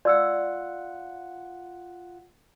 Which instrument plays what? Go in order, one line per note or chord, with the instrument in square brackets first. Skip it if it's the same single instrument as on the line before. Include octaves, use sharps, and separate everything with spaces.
[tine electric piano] F4 F#5 [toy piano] D5 E6